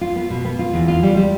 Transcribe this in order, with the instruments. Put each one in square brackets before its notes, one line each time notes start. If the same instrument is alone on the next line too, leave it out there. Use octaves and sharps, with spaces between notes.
[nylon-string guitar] F4
B3
B2
B3
F4
E2
F4
G3
G3